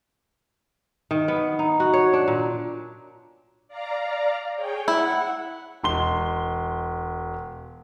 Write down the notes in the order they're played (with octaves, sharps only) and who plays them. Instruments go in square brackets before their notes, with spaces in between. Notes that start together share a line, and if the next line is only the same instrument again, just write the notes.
[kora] D#3
B3
D#4
F#4
C#5
D4
A#2
[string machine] D5 F5 A#5
G#4 C#5 G5
[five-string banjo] E4 [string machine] F#5
[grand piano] E1 C6 G7